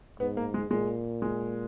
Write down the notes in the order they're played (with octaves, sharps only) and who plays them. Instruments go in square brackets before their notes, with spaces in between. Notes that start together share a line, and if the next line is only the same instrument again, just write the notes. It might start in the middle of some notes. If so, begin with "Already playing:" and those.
[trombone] G#2 [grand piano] B3
[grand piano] A#3
G#3
[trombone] A#2 [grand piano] G#3
[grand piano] G#3